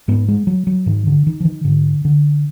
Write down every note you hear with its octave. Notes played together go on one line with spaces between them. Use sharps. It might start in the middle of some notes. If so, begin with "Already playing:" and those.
G#2 B3
G#3
F#3
F#3
G#2 D#3
D3
D#3
F3
D#3
G#2 D3
D3